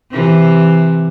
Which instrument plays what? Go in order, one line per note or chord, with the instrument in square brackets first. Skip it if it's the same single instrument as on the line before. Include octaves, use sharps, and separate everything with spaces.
[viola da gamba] C3 E3